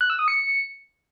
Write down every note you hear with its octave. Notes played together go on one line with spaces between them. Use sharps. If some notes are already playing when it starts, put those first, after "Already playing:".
F#6
E6
D#6
C#7